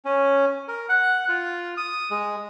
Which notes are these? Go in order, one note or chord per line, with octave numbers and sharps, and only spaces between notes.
C#4
A#4
F#5
F4
D#6
G#3